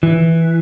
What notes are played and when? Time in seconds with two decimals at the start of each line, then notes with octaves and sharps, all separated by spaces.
0.03 E3